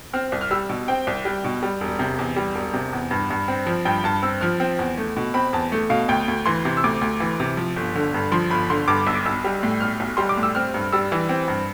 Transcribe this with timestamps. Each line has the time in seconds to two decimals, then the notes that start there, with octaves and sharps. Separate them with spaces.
0.13 C4 F6
0.32 C2
0.41 F6
0.51 G3 E6
0.69 B2
0.88 C4 G5
1.07 C2
1.25 G3
1.44 B2
1.63 G3
1.81 E1
1.99 C3
2.19 E2
2.36 G3
2.55 E1
2.74 C3
2.93 E2
3.11 G2
3.30 G2
3.48 C4
3.67 F3
3.85 G2 G5
4.04 G2 A5
4.22 C4 E6
4.41 F3 F6
4.60 C4
4.79 E2
4.98 A3
5.17 B2
5.34 C4 B5
5.53 E2 A5
5.72 A3
5.90 B2 F5
6.08 D2 G5
6.28 D2
6.46 E3 C6
6.65 C3
6.77 E6
6.84 D2 D6
7.01 D2
7.20 E3
7.40 C3
7.57 F3
7.76 G1
7.95 D3
8.14 G2
8.32 F3 C6
8.50 G1 B5
8.70 D3 C6
8.88 G2 D6
9.07 B1 E6
9.15 D6
9.25 B1 E6
9.44 G3
9.63 A2
9.80 B1 F6
10.00 B1
10.17 G3 C6
10.29 D6
10.37 A2
10.43 E6
10.55 C4 F6
10.74 G2
10.92 G3 E6
11.12 E3
11.29 C4
11.48 G2